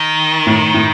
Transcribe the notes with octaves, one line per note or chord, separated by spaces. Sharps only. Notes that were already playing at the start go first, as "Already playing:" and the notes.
Already playing: D#3
A2
A2